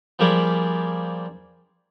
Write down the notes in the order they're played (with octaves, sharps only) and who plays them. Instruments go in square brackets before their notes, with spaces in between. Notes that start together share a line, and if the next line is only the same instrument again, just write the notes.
[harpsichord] F3 G3 A#3 G4 G#4 B5